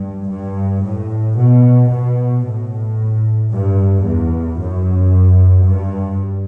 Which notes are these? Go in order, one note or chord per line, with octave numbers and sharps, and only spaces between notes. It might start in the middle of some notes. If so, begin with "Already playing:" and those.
Already playing: G2
G2
A2
B2
B2
A2
G2
E2
F#2
G2